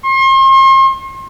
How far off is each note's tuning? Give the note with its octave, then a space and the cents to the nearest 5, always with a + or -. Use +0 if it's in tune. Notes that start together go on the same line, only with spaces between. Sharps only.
C6 +40